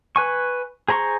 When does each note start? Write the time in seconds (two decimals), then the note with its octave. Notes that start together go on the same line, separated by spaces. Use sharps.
0.16 B4 G#5 C#6
0.88 G#4 C5 A#5 C6 C#6